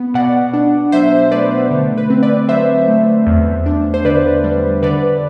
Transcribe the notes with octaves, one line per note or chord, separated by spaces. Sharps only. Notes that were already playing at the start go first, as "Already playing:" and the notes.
Already playing: B3
B2 D5 F#5
D4
F#3 C5 E5
A3 B4 D5
D3
B4
C4
B4 D5
F#3 C5 E5
A3
E2
D4
C5
D3 B4 D5
G3
D3 B4 D5